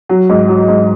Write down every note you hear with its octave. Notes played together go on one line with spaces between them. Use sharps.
F#3
G#2
F#3
G#2